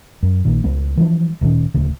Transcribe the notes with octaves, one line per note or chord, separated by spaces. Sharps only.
F#2
A#1 A#2 D#3
C#2 G3 B3
E3 F3 G3 D4
D1 A#2 D#3 C#4
D1 D2 C#3